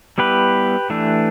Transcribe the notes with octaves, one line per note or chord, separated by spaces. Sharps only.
G3 B3 E4 G4 B4
E3 A3 D4